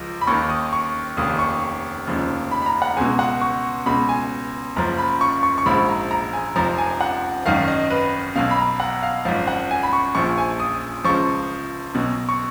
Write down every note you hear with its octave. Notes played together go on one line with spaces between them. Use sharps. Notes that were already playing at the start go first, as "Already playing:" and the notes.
Already playing: C#2 F3
B5
D#2 D#3 C#6
D#6
C#6
F1 D#2 D#3 D#6
C#6
F1 D#2 C#3 F3
B5
B5
A#5
F#5
C#2 B2 G#5
F#5
C#6
C#2 B2 B5
G#5
F#1 F#2 F3 A#5
B5
C#6
C#6
C#6
A#1 G#2 F3 B5
A#5
A#5
G#5
F1 F2 F3 A#5
G#5
F#5
G#1 F#2 D#3 F5
D#5
B4
B1 B2 F5
B5
A#5
F#5
F5
G#1 F#2 F3 F5
F#5
G#5
B5
C#6
A#1 A#2 F3 C#6
G#5
D#6
C#2 C#3 F3 C#6
B1 B2
C#6